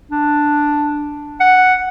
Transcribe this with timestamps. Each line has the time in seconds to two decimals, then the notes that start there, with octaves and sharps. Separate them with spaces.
0.11 D4
1.40 F#5